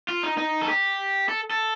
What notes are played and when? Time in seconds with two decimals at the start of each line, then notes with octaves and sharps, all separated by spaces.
0.08 F4
0.23 D#4
0.38 D#4
0.62 A4
0.69 G4
1.29 A4
1.51 A4